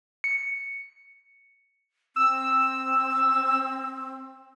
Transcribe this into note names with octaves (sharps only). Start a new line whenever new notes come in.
C#7
C4 E6